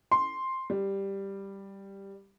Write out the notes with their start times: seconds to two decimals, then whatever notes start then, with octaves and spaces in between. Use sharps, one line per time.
0.12 C6
0.70 G3